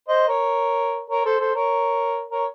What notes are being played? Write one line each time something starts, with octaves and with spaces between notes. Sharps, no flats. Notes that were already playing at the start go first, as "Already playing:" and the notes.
C5 D#5
A#4 C#5
A#4 C#5
A4 C5
A4 C5
A#4 C#5
A#4 C#5